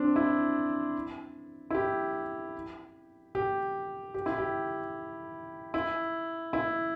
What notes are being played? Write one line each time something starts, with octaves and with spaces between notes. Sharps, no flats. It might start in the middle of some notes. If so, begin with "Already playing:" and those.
Already playing: C4 D4
E4
E4
G4
G4
G4
E4
G4
E4
E4